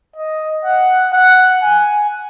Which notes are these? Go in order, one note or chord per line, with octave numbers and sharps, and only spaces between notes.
D#5
F#5
F#5
G#5